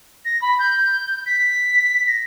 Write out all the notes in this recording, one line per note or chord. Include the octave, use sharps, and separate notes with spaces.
A#6
B5
G6
B6
A#6